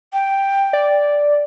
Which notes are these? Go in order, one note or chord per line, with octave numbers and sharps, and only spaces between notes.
G5
D5